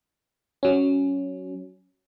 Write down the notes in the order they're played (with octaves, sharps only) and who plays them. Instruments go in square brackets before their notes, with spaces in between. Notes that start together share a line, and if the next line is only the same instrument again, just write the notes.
[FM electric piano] F#3 C#4